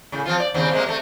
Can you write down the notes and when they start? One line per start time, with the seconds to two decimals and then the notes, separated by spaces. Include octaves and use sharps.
0.12 A2 C#3
0.26 F3 C4 F4
0.40 D5
0.54 D#2 C#3 C4
0.71 C3 G#3 A#3
0.86 C3 A3